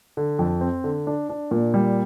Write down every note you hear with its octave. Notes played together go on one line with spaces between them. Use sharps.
D3
F2
C4
D3
D4
D4
A#2
G3